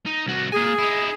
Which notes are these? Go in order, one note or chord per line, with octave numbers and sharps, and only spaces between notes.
D#4
C2 F#4
A#3 G#4 G#5
D#4 E4